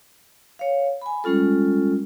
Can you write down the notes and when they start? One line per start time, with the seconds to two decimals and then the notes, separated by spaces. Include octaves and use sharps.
0.59 C#5 F5
1.01 G#5 B5
1.24 G3 G#3 C#4 F4 A4